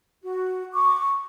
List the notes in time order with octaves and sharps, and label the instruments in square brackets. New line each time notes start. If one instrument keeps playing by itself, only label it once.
[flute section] F#4
C#6 D6